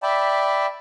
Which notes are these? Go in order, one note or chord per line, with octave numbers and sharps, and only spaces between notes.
D5 E5 G5 A5 B5